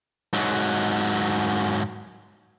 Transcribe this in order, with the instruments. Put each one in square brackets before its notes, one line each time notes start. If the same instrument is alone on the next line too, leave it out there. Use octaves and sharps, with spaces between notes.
[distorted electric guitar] G#2 F#3